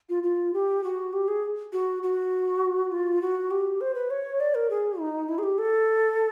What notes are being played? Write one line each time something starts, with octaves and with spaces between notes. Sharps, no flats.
F4
F4
G4
F#4
G4
G#4
F#4
F#4
F4
F#4
G4
C5
B4
C#5
D5
A#4
G#4
D#4
E4
G#4
G4
A4